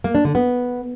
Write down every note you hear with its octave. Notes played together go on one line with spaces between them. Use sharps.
A#3
D4
D3
B3